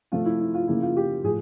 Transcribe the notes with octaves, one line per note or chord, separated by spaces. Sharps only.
C3 F3 A3 C4 F4
E4
E4
F4
C#3 F3 A#3 E4
F4
G4
A2 F3 G#4